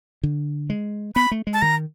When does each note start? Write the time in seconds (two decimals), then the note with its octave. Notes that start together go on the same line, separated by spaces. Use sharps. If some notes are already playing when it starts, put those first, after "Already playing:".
0.23 D3
0.70 G#3
1.15 B3 B5
1.31 A3
1.47 G#3
1.53 A5
1.62 D#3 A#5